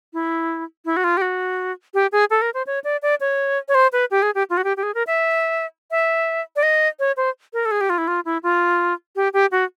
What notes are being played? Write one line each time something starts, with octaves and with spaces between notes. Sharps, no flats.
E4
E4
F#4
F4
G4
F#4
G4
G#4
A4
A#4
C5
C#5
D5
D5
C#5
C#5
C5
B4
G4
G#4
G4
F4
F#4
G4
G4
G#4
A#4
E5
E5
D5
D#5
C#5
C5
A#4
A4
G#4
G4
F4
E4
F4
E4
F4
G4
G4
F#4